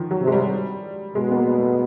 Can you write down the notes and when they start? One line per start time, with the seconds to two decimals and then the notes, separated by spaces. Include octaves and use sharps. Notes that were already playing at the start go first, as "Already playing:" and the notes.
Already playing: D3 D#3 F3
0.11 F#3
0.22 C3
0.27 G#3
0.32 G3
1.15 B2 G#3
1.31 B3
1.36 A#3
1.58 A3